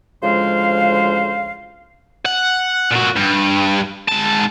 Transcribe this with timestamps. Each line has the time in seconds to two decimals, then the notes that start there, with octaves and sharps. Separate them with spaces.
0.23 D2 C#3 F3 G#3 C5 F5
2.25 F#5
2.91 A#2 F#4
3.16 G2
4.09 G#2 A5